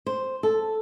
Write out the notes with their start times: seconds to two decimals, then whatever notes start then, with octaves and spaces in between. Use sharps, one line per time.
0.06 C5
0.43 A4